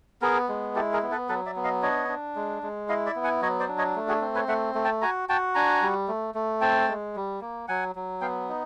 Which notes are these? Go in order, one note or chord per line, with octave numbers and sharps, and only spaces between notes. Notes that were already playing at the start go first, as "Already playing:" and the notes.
B3 G#4 A#4
G#3
E4 G4 A4
G#4 A#4
B3
A4 B4
F#3 A4 B4
D5 E5
B3
D#5 F5
D4 C#5 D#5
D4
G#3
G#3
E4 D#5 F5
D5 E5
B3
F#5 G#5
F#3 C#5 D#5
C5 D5
D4
C#5 D#5
A3
F#4 G#4
C4
B4 C#5
A3 E5 F#5
A3
G5 A5
F#4 G#5 A#5
F#4 G5 A5
D4 G#5 A#5
G3
A3
A3
C4 G5 A5
G#3
G3
A#3
F#3 F#5 G#5
F#3
B3 F5 G5
D#4